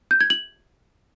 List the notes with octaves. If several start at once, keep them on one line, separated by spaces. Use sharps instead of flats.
G6
G#6
F#7